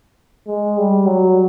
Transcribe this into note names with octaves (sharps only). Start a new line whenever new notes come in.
G#3
G3
F#3